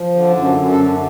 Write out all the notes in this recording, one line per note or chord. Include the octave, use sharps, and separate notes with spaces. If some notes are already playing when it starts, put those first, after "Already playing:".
Already playing: F3
D3
F#2
F#2
A4
D3